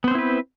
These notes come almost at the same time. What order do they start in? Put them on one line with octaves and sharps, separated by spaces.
B3 C5 C4 E4 B4